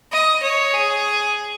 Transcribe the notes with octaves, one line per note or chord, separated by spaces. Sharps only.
D#5
C#5
G#4